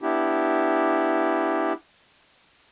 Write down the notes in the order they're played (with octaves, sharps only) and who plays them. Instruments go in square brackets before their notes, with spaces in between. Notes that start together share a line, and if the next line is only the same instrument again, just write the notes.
[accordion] B3 D4 E4 G4